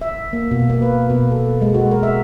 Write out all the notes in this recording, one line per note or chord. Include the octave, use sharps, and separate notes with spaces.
E5
A#3
B2
A#3
B4
B2
A4
G#3
F#4
A#4
E5